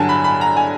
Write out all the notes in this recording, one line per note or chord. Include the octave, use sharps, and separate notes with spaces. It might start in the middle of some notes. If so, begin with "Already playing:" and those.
Already playing: G2 D3 F#3 G#5 A5
B5
B5
A#5
G#5